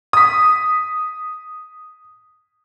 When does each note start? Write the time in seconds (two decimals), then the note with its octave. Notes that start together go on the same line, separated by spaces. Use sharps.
0.13 D#6 B6